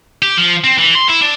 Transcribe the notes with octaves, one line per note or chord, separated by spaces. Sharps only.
G4
F3
C4
E3
C6
E4
D4